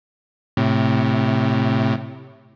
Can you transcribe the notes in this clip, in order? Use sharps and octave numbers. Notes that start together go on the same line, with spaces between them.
A2 C3